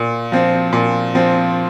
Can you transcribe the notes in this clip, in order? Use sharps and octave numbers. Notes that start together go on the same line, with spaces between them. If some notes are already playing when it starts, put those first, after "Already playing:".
Already playing: A#2
F3 C4
A#2
F3 C4